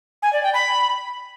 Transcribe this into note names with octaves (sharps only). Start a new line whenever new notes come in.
G#5
D5
G5
B5